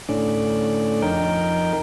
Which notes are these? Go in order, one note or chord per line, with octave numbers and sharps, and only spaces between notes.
A2 D3 C#4 D5
F2 D#4 A#4 G5